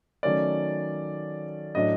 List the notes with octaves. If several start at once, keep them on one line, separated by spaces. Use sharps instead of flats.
D#3 F#3 A3 C#4 D5
A2 F#3 A3 D4 D#5